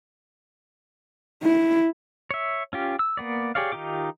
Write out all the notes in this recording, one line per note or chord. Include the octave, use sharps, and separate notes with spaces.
E4
C#5 E5
C#4 F4 G4
E6
A#3 B3 D5
G4 G#4 C#5 D5 F5
D#3 D#4 F4 G4 D6